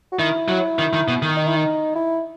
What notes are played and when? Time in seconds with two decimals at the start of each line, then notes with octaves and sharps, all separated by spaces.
0.12 F#4
0.19 D#3 E4
0.48 F#3
0.79 D#3
0.93 D#3
1.08 B2
1.22 D#3
1.37 D#4
1.47 E4
1.57 D#4
1.95 E4